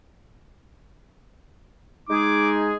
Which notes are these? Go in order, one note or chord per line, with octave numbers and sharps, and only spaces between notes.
G#3 D#4 G#4 D6